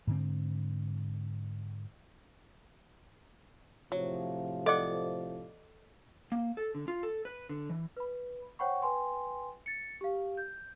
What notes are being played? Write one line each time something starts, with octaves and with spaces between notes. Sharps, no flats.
G#2 D3 C4
A2 C3 F3 F#3
A4 D5 D#5 F#5 D6
A#3
A4
D3
F4
A4
B4
D3
E3
B4 B5
C5 C#5 F#5 G5 B5 C#6
B4 G5 G#5 C6
A6 C#7
G4 F5
G6